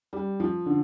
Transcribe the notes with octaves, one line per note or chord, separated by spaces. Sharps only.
G3
F3
D3